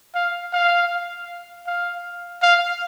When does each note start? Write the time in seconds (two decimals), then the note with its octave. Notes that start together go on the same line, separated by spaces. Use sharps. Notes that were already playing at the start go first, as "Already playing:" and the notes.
0.15 F5
0.53 F5
1.67 F5
2.42 F5